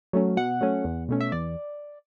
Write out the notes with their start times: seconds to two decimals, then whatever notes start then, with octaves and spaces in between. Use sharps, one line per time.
0.13 F#3 A3 C#4
0.37 B2 F#5
0.61 F#3 A3 C#4
0.84 E2
1.09 B2 A3 C#4
1.21 E5
1.32 E2 D5